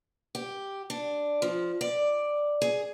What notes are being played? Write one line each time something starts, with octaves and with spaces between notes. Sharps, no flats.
G4
D4
F3
D5
G#4